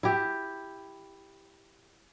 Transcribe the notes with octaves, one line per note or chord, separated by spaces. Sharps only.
E4 G4